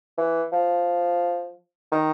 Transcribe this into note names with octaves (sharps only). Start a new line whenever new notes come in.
E3
F3
D#3